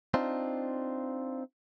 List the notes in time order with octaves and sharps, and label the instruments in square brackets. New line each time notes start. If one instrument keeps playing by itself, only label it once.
[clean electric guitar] C4 D4 D#4 F4